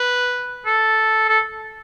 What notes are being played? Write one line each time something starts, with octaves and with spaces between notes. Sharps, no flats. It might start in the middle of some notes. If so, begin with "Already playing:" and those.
Already playing: B4
A4
A4